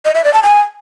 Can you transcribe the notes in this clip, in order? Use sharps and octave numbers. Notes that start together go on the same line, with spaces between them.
D#5
E5
D5
A5
G#5